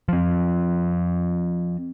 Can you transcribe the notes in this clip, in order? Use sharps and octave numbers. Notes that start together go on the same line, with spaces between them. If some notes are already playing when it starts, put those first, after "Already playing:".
F3 C4